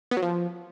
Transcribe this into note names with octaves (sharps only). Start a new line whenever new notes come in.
B3
F#3
F3